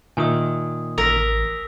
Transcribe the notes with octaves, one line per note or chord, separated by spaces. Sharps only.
A#2 D#3 E5 G#5 D#6
A1 A#4 E6 A#6 B6